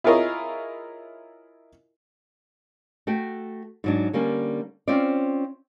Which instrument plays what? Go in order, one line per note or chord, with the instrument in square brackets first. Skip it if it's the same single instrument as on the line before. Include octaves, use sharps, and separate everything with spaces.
[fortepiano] E4 F4 G#4 A#4 C#5 D#5
[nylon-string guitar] A3 F#4 G5
G#2 F#3 D4
D3 G3 A#3 C#4
C4 C#4 F4 C5 D5